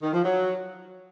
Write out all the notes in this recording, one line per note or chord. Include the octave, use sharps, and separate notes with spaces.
D#3
F3
F#3